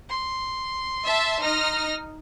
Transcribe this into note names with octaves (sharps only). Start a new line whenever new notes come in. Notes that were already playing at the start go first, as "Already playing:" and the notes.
C6
E5 A5
D#4 F6 A#6